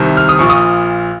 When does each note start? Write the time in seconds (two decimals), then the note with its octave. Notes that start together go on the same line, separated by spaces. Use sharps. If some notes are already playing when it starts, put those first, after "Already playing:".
Already playing: C2 C3 D#3
0.17 F6
0.29 D#6
0.39 A#1 A#2 C#6
0.50 D#6